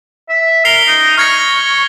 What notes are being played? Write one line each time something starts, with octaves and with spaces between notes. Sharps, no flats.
E5
A#4 C7 F7 G7
D#4
C#6 F6 G#6 A#6